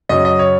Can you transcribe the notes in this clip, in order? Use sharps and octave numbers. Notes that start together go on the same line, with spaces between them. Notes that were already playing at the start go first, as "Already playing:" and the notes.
F#2 C#3 F#3 D#5
D#5
C#5